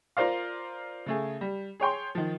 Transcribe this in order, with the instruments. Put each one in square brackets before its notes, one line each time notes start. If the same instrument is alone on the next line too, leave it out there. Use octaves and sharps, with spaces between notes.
[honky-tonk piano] F4 A#4 C5 D5 F5
C#3 A3 G#4
G3
G#4 C#5 G5 C6
D#3 F3